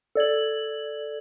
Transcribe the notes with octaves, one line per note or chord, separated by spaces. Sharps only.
A4 D5 G#6 F#7